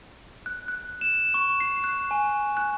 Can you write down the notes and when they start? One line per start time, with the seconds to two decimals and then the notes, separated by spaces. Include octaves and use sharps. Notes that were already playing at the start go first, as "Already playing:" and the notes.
0.46 F#6
0.68 F#6
1.01 E7
1.34 C#6
1.60 C7
1.84 F#6
2.11 G#5
2.57 F#6